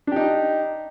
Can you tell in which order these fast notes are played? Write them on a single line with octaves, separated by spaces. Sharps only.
D4 G4 D#4